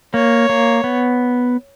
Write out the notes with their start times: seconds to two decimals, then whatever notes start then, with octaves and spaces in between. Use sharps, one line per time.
0.14 A#3 C#5
0.49 A#3
0.84 B3